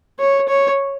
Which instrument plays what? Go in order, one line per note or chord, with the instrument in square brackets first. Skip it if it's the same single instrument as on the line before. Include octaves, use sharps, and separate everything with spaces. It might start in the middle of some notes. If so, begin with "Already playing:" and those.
[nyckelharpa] C#5
C#5